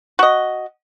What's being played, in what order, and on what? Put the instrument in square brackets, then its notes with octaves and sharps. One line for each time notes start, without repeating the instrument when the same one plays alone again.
[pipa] F#4 D#5